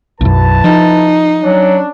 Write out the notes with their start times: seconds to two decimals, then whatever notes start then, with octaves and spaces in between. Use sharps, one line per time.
0.21 B1 F#2 E4 B4 A5
0.64 F3 D#4
1.43 F#3 C#4 D4